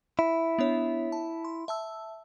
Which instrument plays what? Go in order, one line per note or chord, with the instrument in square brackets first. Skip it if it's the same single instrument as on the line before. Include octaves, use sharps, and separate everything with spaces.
[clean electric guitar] E4
[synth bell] B3 D4 C#5
A5
C6
E5 A5 E6